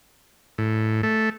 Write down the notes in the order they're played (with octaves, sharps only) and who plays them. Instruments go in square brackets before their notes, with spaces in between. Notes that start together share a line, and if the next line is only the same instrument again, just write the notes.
[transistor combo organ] A2
A3